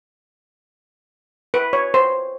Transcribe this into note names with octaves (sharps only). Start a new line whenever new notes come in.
B4
C#5
C5